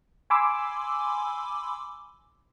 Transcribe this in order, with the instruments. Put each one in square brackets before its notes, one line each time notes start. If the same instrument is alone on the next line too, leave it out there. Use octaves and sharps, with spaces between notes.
[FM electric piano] G#5 B5 C6 D6 E6